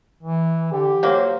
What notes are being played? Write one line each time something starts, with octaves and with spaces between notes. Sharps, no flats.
E3
D3 G4
F#3 A#3 C5